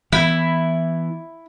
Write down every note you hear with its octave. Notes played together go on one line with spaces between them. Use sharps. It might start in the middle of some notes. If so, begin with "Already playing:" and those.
E3 B3 E4